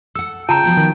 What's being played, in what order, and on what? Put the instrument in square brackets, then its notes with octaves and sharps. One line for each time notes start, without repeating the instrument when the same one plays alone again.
[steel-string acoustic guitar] A4 F#5 [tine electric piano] E6
[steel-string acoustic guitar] C#3 [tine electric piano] F4 [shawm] G5 [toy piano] A5 A#5
[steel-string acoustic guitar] F3 B3 F#4
[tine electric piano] D#3